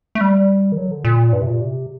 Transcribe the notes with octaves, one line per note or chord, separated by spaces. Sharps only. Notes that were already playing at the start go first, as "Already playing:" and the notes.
A3
G3
D#3
F#3
D3
A#2
G2
C3
A#2
C3